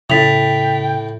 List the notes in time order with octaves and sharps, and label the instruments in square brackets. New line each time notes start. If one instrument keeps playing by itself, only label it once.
[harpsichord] A2 [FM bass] C#3 [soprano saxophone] G5 [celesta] A6 B6 F7